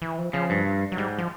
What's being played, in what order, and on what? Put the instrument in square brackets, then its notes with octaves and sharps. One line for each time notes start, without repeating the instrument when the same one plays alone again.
[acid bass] E3
F3
[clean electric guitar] C#3 [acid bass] F3
[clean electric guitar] G2
[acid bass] F#3
[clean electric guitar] G#2 [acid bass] G3
[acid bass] F3